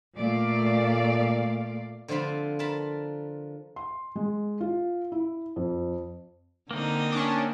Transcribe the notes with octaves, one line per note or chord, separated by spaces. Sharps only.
A#2 A3 D5 F5
D3 F3 C4 F4 B5
F4 A#4 A5 B5
C6
G#3
F4
E4
F2
D3 A#3 C4 D#4 D#5
C#4 D4